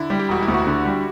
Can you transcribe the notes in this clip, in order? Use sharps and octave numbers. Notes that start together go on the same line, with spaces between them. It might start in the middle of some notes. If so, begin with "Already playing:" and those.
Already playing: D3 E4
G3
G4
E1 F#4
E4
D2
F#4
D3
G3